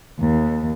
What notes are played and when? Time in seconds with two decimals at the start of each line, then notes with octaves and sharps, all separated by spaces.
0.21 D#2